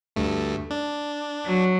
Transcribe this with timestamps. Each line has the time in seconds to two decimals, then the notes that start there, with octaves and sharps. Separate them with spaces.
0.16 D2 G2 A3
0.70 D4
1.45 F#3